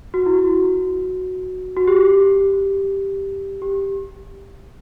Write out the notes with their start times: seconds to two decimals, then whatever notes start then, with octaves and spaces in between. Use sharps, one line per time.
0.14 F#4
0.26 E4
0.39 F#4
1.77 F#4
1.88 G4
3.62 G4